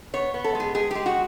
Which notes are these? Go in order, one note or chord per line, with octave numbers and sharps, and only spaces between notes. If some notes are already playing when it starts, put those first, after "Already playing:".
B3 C#5
B3
A4
G#3
G#4
G#3 G#4
G#3 G4
F#4